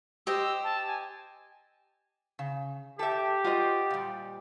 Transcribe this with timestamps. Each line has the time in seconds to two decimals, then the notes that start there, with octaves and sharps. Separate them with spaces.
0.27 G4 C5 D#5 E6
0.64 A5
0.87 G#5
2.39 C#3
2.99 G4 A4 E5
3.44 F4 F#4 C5 D#5
3.90 A#2 G3